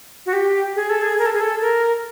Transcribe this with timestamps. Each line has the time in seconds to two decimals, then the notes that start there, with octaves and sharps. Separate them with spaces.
0.26 F#4
0.33 G4
0.76 G#4
0.90 A4
1.02 G#4
1.18 A#4
1.26 A4
1.33 G#4
1.41 A4
1.61 A#4